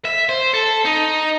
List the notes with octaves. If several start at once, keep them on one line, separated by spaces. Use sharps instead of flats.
E5
C5
A4
D#4